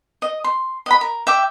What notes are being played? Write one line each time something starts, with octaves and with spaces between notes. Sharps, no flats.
D#5
C6
D#5 F#5 B5
A#4
E5 G5 D6